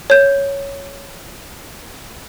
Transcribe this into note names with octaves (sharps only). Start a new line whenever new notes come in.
C#5 G6